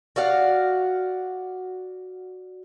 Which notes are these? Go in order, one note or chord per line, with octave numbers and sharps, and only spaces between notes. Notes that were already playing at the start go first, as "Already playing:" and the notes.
F#4 D5 F5 F#5